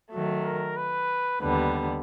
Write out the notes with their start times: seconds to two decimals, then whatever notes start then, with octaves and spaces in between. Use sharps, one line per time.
0.12 D#3 F#3 A3
0.45 A#4
0.77 B4
1.41 D#2 D3 G3 B3 B4